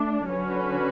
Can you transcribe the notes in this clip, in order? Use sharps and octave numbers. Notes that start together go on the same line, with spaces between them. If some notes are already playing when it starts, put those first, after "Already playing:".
Already playing: A3 D4
D3 F#3 C#4 F#4 B4